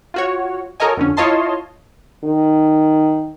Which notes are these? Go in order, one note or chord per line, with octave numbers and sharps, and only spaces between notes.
F4 F#4 C#5
F#4 A4 A#4 C#5 D#5 G#5
F2 D3 C#4
E4 F4 C#5 D#5 A5 C6
D#3